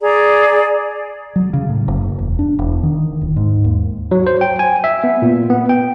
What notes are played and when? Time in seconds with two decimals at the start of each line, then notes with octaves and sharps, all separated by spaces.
0.01 G#4 D5 A#5
1.36 F#3
1.54 C#3
1.69 A2
1.88 F#1
2.19 E1
2.39 D4
2.59 E1
2.83 D#3
3.21 D1
3.36 G#2
3.64 D#2
4.11 F#3
4.27 C5
4.41 G5
4.59 G#5
4.84 E5
5.04 B3
5.22 A#2
5.50 B3
5.69 G5